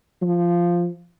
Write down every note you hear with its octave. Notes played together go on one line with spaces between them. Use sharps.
F3